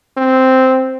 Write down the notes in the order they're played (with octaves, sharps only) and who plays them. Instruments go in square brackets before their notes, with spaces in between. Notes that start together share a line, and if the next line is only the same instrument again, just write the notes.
[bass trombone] C4